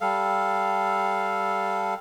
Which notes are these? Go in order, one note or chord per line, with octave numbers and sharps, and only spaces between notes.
G3 A4 F5